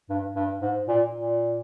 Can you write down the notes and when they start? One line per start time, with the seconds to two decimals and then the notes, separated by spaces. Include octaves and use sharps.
0.09 G2
0.36 G2
0.62 G#2
0.88 A#2
1.14 A#2